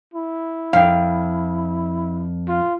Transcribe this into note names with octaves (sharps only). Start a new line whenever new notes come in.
E4
F2 F5 G5
F4